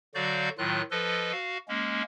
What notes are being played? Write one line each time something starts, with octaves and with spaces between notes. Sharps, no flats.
D3 F#3 F#4 D5 F5 G6
A2 D#3 F#3 F4 F#6
F3 A4 B4 D#5
F#4 F5
G#3 A#3 C#4